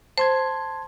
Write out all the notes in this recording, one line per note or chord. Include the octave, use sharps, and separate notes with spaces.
C5 A5 C6 G#6